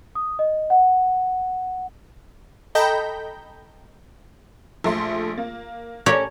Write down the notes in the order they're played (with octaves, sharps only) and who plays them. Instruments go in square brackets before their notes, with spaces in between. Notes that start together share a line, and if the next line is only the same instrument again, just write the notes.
[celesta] D#6
D#5
F#5
[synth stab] A4 D#5 G5 A#5 B5 G6
[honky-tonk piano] A#1 A3 C6
A#3
[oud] C#4 A4 D5 [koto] G4 A#4 C#5